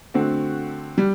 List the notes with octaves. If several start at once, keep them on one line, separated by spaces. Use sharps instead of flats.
D3 A3 C4 F#4
G3